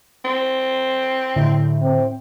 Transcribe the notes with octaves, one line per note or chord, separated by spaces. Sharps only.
C4
A2 D3
C4